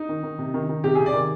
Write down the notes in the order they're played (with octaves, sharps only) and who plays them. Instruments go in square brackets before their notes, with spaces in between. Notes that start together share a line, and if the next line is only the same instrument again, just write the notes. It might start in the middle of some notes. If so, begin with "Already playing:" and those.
Already playing: [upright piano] D#4
D#3
D#3
C3
D#3
D#3
C3 G4
C3 G#4
D5
D#3